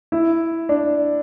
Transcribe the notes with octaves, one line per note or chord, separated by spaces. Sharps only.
E4
D4